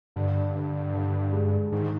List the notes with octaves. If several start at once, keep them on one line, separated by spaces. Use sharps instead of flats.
G2 D3
D3
D3
G#3
G#2 D#3